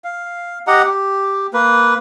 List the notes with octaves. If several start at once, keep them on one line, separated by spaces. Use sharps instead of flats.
F5
G4 D#5 F#5 A#5
G4
A#3 B4